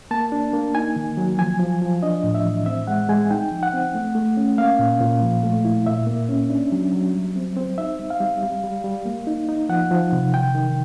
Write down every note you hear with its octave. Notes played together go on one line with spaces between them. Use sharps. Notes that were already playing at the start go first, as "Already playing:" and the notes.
A#3 A5
D4
A#3
D#4 G#5
D#3
F#3
F3 G#5
F3
F3
D4 D#5
A2
E5
E3
C4 E5
G#3 F#5
G#3 G#5
D#4 G5
F3
F#5
C4
A3
A3
C#4
A#3 F5
A#2
A#2
F3
A3
E4
A#2 E5
A#3
C#4
D4
F#3
F#3
G3
C4
C4
D#4 E5
G3
F5
G3
G3
G3
G3
A#3
D#4
D#4
F3 F#5
F3
C3
D#3 G5
D#3